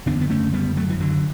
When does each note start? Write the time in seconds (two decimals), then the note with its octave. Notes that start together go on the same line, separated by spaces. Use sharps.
0.06 F#1 E2 D3 B3 D4
0.21 B3
0.30 A3 C#4
0.53 G3 B3
0.77 F#3 A3
0.90 E3
1.00 D3 F#3